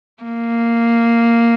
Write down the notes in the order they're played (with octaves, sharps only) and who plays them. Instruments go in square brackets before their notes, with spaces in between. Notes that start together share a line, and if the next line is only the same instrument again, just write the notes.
[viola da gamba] A#3